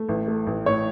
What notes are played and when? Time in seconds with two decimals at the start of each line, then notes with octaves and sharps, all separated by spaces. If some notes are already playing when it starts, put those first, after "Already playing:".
Already playing: A3
0.09 A1
0.28 A3
0.47 A1
0.66 A2 C#5